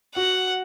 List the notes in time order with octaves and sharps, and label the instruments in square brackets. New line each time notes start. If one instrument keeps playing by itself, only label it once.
[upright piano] F#4 [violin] F#5